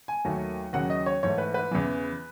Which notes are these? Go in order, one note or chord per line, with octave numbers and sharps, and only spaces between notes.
G#5
D#2 D#3 F#3 A3
D#2 C#3 F#3 F#5
D#5
C#5
G#2 E3 A3 C#5
B4
B4
E2 C#3 E3